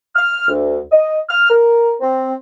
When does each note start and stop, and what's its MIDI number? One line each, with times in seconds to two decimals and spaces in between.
0.15 0.47 89
0.48 0.79 38
0.91 1.17 75
1.29 1.48 89
1.50 1.91 70
2.00 2.31 60